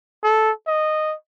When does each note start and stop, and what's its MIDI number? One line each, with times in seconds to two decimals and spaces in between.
0.24 0.51 69
0.67 1.15 75